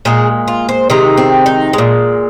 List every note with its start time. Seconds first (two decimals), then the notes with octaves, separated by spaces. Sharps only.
0.05 A#2 G#3 G#4
0.48 F4
0.69 C5
0.90 C3 D#3 G#3 D#4
1.18 C4
1.46 D#4
1.73 A#2 G#3